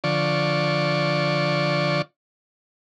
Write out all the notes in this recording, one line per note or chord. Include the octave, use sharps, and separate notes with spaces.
D3 F3 D5 C#6